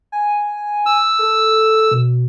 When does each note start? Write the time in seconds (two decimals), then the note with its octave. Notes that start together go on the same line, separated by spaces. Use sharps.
0.12 G#5
0.86 E6
1.19 A4
1.91 B2